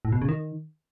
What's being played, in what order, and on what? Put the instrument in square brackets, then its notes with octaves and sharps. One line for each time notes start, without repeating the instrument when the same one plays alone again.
[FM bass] A2
B2
C#3
D#3